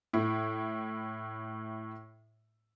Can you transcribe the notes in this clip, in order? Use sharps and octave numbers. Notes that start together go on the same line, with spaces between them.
A2 E4